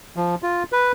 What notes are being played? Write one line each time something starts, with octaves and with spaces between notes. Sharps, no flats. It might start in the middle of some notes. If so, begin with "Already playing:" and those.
F3
F4
B4